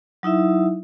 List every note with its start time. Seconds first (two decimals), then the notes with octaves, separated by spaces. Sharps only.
0.23 F#3 D#4 E4 E5